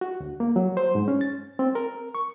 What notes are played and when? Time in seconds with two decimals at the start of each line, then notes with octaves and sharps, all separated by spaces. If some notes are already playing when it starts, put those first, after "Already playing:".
0.01 F#4
0.20 D2
0.40 A#3
0.56 F#3
0.77 C5
0.95 G#2
1.08 C#4
1.21 A6
1.59 C4
1.75 A#4
2.15 C#6